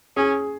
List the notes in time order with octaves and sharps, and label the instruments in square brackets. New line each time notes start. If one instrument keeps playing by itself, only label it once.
[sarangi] C#4 [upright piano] G#4